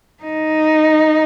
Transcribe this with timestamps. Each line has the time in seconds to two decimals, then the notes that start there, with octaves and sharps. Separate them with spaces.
0.23 D#4